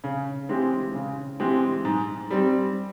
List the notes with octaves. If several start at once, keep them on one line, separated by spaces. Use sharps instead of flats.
C#3
E3 G#3 C4 G4
C#3
E3 G#3 C4 G4
G#2
G3 C4